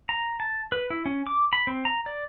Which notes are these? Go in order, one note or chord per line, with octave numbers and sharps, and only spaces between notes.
A#5
A5
B4
E4
C#4
D6
B5
C4
A#5
D5